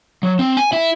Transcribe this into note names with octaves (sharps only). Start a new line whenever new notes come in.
F#3
C4
G#5
E4